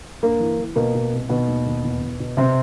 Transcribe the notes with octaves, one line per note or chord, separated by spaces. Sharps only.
G2 A#3
E3
E3
B2 A#3
B2
C2
B2 D#3 B3
D#2
D#2
E2
B2
B2
C3 C4